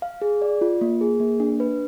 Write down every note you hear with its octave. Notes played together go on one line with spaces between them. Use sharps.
F5
G#4
D5
F4
A#3
G#4
A#3
D4
B4